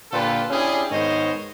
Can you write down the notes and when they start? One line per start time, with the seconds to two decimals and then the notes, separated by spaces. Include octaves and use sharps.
0.12 A#2 D3 F4 G4 A4 B4
0.51 C#4 D4 E4 G4 G#4
0.91 G#2 D#3 B3 C5 C#5 D#5